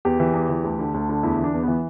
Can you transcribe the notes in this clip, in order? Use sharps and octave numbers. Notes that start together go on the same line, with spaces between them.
E2 G4
E3
E2
E3
D2
D3
D2
D3
E2 E4
E3
D4
E2
E3 B3